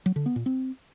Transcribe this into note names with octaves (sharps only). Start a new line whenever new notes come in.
F#3
D3
B3
A#2
C4